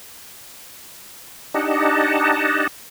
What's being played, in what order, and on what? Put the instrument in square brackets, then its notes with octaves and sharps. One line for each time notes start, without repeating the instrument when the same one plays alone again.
[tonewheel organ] D4 D#4 G4 D#5 F#5 A5